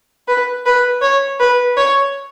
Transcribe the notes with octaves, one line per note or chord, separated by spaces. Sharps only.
B4
B4
C#5
B4
C#5